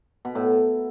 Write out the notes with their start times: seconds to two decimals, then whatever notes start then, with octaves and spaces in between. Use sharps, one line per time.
0.25 B2
0.35 A2